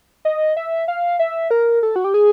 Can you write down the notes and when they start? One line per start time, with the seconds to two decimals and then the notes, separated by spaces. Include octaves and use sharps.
0.25 D#5
0.57 E5
0.88 F5
1.19 E5
1.51 A#4
1.83 A4
1.96 F#4
2.04 G4
2.14 G#4